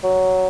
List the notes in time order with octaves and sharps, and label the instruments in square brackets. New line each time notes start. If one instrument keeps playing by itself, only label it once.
[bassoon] F#3